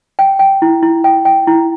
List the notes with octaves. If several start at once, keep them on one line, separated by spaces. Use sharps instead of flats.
G5
G5
E4
E4
G5
G5
E4